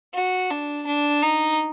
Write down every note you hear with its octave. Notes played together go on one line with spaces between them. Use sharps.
F#4
D4
D4
D#4